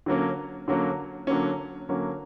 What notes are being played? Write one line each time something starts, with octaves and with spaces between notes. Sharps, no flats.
D3 F#3 A#3 C#4
D3 F#3 A#3 C#4
D3 F#3 A#3 C#4
D3 F#3 A#3 C#4